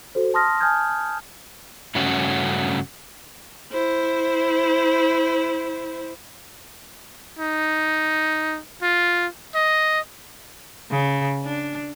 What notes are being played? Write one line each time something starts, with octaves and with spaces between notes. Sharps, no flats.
F#4 A4 C5
A5 C6 D#6 F6 A#6
G#5 A5 D#6 F6 G6 G#6
G2 C#3 A3 C#4 F#4
E4 C5
D#4
F4
D#5
C#3
D4